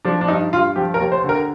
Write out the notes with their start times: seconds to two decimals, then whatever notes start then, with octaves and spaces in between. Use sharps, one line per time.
0.05 F3 D4
0.21 D4
0.28 G2 D#4
0.52 G2 F4
0.76 F3 G4
0.94 A#4
0.99 D#2
1.12 C5
1.24 D3
1.29 A#4